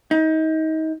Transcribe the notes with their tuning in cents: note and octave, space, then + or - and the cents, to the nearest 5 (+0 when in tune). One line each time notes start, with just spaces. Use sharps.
D#4 +30